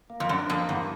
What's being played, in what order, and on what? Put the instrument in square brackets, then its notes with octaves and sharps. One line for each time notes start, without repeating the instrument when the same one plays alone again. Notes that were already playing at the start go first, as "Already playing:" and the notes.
[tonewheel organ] A#3
[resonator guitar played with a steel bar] F2
[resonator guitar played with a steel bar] F#2 [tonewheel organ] D4
[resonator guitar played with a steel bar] F2 [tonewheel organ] A#3
[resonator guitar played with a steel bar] E2 [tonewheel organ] G2